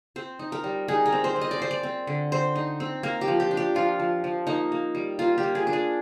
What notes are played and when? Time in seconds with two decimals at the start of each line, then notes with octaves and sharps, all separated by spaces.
0.16 C4 C5
0.39 D#4
0.52 A#4
0.64 G3
0.88 D#4 G#4
1.06 A#4
1.12 C4
1.24 C5
1.36 C4
1.41 D#5
1.51 D5
1.60 C4 C5
1.71 D5
1.83 C4
2.07 D3
2.32 C4 C5
2.56 D#4
2.80 C4
3.03 A#3 A#4
3.21 G4
3.28 F3
3.40 G4
3.51 D4
3.57 G4
3.75 F3 F4
3.99 F3
4.24 F3
4.47 A#3 D#4
4.72 A#3
4.95 G3
5.19 A#3 F4
5.38 G4
5.43 A#3
5.55 G#4
5.67 D4
5.73 G#4